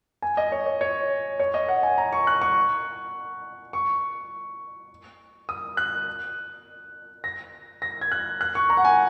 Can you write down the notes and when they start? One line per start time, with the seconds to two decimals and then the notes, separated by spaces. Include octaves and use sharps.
0.22 G#5
0.37 D#5
0.52 C#5
0.67 C#5
0.81 C#5
1.40 C#5
1.54 D#5
1.69 F#5
1.83 G#5
1.98 A#5
2.13 C#6
2.27 F#6
2.42 C#6
3.73 C#6
5.49 D#6
5.77 F#6
7.24 A#6
7.82 A#6
8.01 G#6
8.12 F#6
8.41 F#6
8.55 C#6
8.70 A#5
8.77 F#5
8.85 G#5